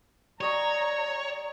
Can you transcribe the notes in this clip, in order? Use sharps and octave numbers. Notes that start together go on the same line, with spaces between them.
G3 C#5 D#5 A#5 C#6